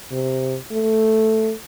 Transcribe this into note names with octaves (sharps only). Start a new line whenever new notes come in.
C3
A3